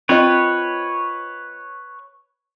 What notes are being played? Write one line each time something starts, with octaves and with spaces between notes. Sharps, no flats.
C4 F4 B4 C#5 D#5